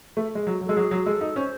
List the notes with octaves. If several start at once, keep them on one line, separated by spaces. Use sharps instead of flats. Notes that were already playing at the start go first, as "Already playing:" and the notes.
A3
G#3
F#3
F#3
G#3 A4
F#3 G#4
F#3
G#3 A4
D#4
C#4 C5